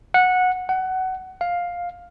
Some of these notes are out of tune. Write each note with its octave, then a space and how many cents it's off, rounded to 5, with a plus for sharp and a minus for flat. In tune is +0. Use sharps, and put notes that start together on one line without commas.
F#5 -15
F#5 +20
F5 +10